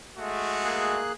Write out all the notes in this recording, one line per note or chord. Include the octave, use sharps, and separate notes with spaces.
G#3 A3 F#4
A#3 G#4 F#6